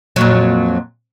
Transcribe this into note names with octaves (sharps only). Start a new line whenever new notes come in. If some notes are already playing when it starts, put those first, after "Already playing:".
F2 A#2 F#3